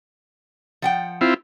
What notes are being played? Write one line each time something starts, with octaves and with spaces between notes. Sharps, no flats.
F3 F#5 G5
C4 E4 F4